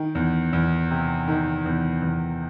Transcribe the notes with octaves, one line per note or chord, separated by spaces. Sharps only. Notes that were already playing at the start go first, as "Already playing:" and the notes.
Already playing: D#3
E2
E2
C3
D#3
E2
E2